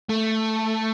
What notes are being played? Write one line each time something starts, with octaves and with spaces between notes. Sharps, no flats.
A3